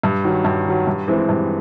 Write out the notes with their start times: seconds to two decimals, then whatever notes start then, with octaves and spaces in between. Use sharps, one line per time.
0.03 G2
0.24 D#3 F#3
0.44 G2
0.66 D#3 F#3
0.87 G2
1.08 E3 G#3 C4
1.29 G2